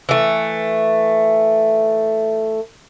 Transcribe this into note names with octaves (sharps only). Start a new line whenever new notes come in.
E3 A3